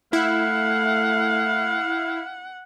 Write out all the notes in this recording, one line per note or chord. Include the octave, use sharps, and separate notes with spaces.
A3 E4 F5 F#5